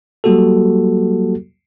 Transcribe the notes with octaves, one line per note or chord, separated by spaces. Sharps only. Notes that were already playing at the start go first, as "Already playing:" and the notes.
F#3 G3 A#3 F#4 G4 A4